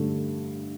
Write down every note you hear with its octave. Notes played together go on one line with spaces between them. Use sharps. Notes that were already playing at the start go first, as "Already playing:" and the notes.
Already playing: G2 D3 A3